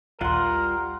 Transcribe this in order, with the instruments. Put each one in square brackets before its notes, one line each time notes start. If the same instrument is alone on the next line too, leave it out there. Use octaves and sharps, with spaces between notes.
[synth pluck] A#1 D#2 [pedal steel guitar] G3 F4 F#6 [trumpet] A#4 [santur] F#5 C6